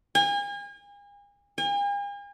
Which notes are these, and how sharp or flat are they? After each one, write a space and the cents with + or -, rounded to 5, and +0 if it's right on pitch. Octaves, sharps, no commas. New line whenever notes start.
G#5 -40
G#5 -45